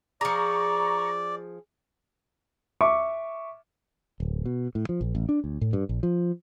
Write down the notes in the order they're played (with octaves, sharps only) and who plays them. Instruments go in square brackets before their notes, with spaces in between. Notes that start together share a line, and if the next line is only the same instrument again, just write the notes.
[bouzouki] F3 G#4 [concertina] D5 [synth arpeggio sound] A#5 C#6
[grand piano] E5 C#6 D6
[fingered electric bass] D1
B2
A2
F3
A#1
A1
D4
D2
A2
G2
A#1
F3